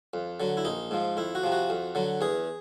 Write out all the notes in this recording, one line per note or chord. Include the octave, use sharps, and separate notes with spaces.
F2
D3 F#3
E4
A#1 D#4
G#2 F3
F2 E4
F#4
C3 F3
F#4
F2
D3 F#3
E2 G#4